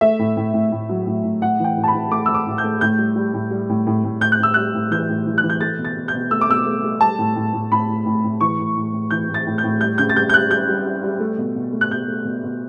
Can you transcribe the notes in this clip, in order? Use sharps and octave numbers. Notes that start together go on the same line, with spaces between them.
A3 E5
A2
A2
A2
A2
F#3
A2
A2
A2 F#5
E3 G5
A2
A5
B5
E3
A3 D6
A3 E6
D6
A2
G6
A3
A2 G6
G3
G3
A2
G3
A2
A2
A2
A2 G6
F#6
A2 E6
G3 F#6
A2
E3 G6
A2
E3
F#6
E3
G6
A3 A6
B2
A6
B2
G6
B2
A3 E6
D6
B2 E6
A3
A3
G3 A5
A2
A2
A2
A2 B5
A2
A2
A2
E3 C#6
A2
A2
A2
E3 G6
A2
A6
A2
G6
A2
G3 G6
C#3 G6
A6
G3 G6
G6
G3 F#6
G3 G6
G3
G3
G3
A3
B2
B2
A3
F#6
B2 G6
A3
B2
B2